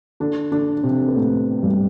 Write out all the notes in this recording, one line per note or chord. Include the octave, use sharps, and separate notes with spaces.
D3 D4
D3 D4
D4
C3 C4
B3
A2 A3
G2 G3